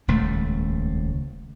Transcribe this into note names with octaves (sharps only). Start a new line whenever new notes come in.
D#1 C#2 A3